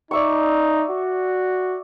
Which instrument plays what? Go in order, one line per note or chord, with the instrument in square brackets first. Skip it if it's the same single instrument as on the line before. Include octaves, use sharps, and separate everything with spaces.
[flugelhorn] D#4 [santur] D5 E5 C#6
[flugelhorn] F#4